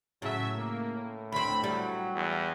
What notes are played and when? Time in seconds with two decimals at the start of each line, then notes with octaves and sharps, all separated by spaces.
0.22 A2 C#3 F#3 C#4 E5
0.57 A#3
0.95 A2
1.32 D2 C4 B5
1.64 F#3 G3
2.15 E2